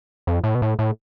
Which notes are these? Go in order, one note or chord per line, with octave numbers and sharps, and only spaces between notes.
F2
A2
B2
A2
A2